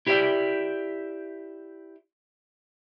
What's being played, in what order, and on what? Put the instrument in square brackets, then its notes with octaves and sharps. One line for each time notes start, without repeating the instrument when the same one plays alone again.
[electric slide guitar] E4 G4 C5 D5 E5